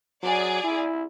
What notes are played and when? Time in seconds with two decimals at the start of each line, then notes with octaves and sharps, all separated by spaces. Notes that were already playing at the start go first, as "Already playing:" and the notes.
0.23 F#3 G#4 D5
0.64 E4